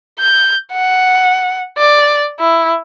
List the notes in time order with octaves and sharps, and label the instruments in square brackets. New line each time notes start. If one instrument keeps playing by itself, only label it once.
[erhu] G6
F#5
D5
E4